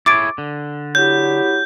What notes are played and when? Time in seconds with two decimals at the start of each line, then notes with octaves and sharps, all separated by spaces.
0.06 E4 G#4 C#5 D6 A6 D7
0.38 D3
0.95 F#3 E4 G4 G6